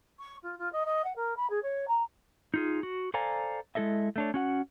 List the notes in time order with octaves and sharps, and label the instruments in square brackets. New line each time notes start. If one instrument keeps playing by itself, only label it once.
[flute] C#6
F4
F4
D#5
D#5
F#5
A#4
B5
G#4
C#5
A#5
[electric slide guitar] D#4 F4 G#4
F#4
A4 C5 D5 F5 G#5 A#5
G#3 E4 A4 D#5 E5
A3 D4 C#5
C#4 F#4 F#5